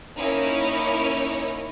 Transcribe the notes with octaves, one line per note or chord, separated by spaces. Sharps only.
A#3 C#4 D#4 E4 A#4 C#5